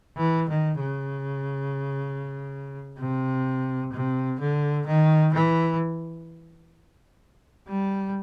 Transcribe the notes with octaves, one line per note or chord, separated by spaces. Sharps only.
E3
D#3
C#3
C3
C3
D3
D#3
E3
G3